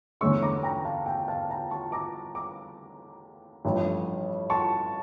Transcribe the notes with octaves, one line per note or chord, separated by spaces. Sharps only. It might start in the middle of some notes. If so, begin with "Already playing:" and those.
E2 D3 A3 C#4 C#6 E6
A#5 D6
G5 A#5
F5 A5
G5
F5 A5
G5 A#5
A5 C#6
A#5 D6
A#5 D6
A1 G2 F3
A5 C#6